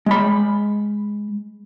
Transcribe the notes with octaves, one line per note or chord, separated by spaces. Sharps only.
G#3 B5